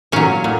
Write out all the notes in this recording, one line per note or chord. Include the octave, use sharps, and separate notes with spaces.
A#2 F#3 C#4
A#2